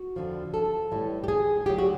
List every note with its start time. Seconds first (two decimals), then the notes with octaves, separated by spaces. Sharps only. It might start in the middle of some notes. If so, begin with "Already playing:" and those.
Already playing: F#4
0.16 F2 D3 F3
0.54 A4
0.91 A2 E3 G3
1.24 G4
1.28 G#4
1.66 D2 D3 F#3 G4
1.78 F#4